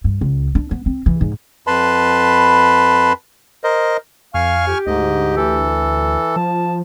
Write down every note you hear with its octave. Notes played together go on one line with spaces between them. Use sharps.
G2
C#2
D4
B3
C4
E3
G#2
F2 B4 A5 B5 C6
A#4 C5 D#5
F2 F5 G#5 C#6 F6
G4
D2 G#2 D#5
E3 A4
F3 A5